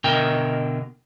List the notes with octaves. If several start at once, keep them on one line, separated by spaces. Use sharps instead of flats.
B2 D3 A#4 D#5 G5